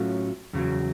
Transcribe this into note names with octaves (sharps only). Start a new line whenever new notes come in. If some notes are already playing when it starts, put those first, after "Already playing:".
Already playing: A2 F#3 A3 C#4 F4
E2 C#3 F#3